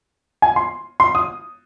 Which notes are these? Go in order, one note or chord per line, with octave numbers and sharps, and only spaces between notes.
G#5
C6
C6
D#6